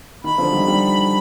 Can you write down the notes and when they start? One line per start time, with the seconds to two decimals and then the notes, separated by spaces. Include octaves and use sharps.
0.24 D#3 B5
0.38 D3 F3
0.52 D#3 G3
0.67 D#3 G3